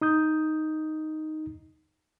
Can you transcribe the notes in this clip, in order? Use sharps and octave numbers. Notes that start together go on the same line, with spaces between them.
D#4 D#6 G6